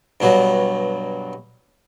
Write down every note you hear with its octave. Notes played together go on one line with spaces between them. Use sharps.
G2 B2 F#3